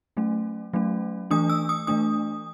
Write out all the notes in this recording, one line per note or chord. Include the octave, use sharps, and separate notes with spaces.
F#3 A3 C#4
F#3 A3 C#4
E3 A3 D4 D#6
E6
D#6
E3 A3 D4 D#6